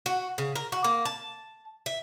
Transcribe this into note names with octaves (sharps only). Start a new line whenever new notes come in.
F#4
C#3
A#4
F#4
A#3
A5
E5